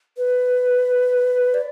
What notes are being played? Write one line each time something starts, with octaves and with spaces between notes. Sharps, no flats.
B4
D5